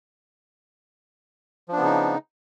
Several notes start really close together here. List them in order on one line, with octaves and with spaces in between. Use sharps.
F3 D4 B3 C#3 D#4